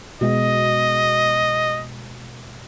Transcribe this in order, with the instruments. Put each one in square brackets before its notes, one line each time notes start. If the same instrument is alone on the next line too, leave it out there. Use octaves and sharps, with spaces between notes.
[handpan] B2 G#3 [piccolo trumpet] D#5